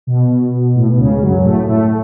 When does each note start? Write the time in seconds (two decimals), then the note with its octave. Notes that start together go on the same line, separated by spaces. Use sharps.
0.07 B2
0.75 A2
0.88 B2
0.99 C#2 C#3
1.21 F#2 F#3
1.44 A2 A3
1.67 A2 A3